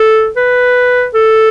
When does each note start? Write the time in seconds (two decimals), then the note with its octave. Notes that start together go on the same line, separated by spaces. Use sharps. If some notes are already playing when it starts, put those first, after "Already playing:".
Already playing: A4
0.37 B4
1.14 A4